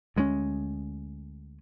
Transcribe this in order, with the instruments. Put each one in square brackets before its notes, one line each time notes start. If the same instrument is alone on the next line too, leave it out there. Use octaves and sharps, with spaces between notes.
[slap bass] D2 G#3 A#3 C#4